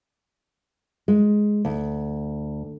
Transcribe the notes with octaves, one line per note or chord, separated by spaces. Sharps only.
G#3
D2